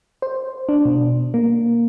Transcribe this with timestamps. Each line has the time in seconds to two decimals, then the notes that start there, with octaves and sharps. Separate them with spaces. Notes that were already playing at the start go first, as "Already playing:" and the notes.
0.22 C5
0.69 D4
0.85 B2
1.34 A#3